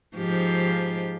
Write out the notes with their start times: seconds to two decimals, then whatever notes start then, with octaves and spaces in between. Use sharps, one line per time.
0.17 G#2 F3 G4